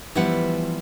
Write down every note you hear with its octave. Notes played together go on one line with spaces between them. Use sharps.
E3 F3 G3 B3 E4 F#5